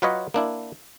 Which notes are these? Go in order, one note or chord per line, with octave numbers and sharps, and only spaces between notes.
F#3 F4 B4 C#5 D#5 F#5
A#3 D4 E4